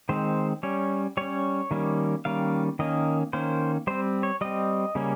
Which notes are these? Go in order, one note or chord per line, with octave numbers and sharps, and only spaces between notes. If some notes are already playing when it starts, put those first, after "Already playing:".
D#3 G#3 C4 C5
G3 C#4 C#5
G3 C#4 C#5
D#3 G3 A#3 C#4
D#3 G3 A#3 C#4 F5
D#3 A#3 C#4 D#5
D#3 A#3 C#4 C5
G3 C4 C5
C#5
G3 C4 D#5
C#3 G3 A#3 C#4